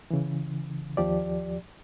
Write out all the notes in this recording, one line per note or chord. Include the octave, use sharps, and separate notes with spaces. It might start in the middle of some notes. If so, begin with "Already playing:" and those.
C#3 E3
D#2 F3 G4 D5